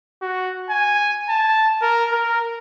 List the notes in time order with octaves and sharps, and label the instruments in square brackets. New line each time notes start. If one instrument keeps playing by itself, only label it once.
[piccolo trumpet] F#4
G#5
A5
A#4
A#4